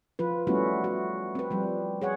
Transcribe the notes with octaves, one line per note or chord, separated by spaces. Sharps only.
F3 F4 B4
G3 A3 B3 C#4 E4 F#4
F#4
C4 B4
F3 G3
G#4 C#5 F#5